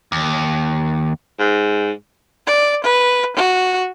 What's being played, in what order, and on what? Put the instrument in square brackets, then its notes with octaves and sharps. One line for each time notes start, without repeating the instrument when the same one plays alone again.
[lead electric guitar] D#2
[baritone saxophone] G#2
[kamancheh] D5
B4
F#4